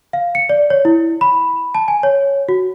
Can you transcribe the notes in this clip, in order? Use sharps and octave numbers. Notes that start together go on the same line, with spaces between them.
F5
C#7
D5
C#5
E4
B5
A5
G#5
C#5
F#4